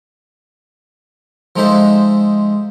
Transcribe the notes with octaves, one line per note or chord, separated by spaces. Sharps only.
F3 G#3 D#4 A4 C5 E5